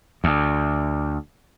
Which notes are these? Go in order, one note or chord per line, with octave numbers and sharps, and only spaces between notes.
D2